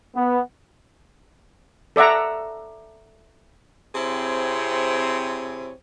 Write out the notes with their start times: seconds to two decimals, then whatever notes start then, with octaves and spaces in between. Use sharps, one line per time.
0.15 B3
1.96 A4 D5 E5 F#5 A#5
3.95 C3 C4 E4 G#4 C#5